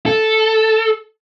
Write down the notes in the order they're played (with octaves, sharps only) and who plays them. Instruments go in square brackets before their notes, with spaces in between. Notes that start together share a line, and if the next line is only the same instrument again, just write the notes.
[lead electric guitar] A4